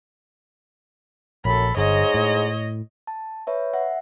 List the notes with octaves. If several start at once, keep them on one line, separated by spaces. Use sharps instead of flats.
A#1 F#2 A4 B5
G1 G#2 C#5 D#5
A2
A5
B4 C#5 E5
E5 F#5